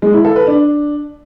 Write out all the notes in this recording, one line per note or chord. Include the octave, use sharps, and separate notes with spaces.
G#3
E4
A4
B4
D4